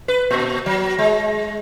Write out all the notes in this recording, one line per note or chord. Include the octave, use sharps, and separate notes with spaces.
B4
A#2
F#3
G#3